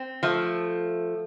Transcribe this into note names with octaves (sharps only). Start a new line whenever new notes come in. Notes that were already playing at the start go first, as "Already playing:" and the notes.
Already playing: C4
F3 A3